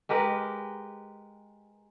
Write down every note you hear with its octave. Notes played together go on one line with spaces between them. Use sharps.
G#3 G4 A#4 B4